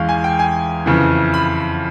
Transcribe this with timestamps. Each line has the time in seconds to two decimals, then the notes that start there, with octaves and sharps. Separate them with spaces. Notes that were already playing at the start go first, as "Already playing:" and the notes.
Already playing: E2 E3 G#3 C#4 F5
0.09 G#5
0.24 G5
0.39 G#5
0.86 F2 C#3 E3
1.34 B5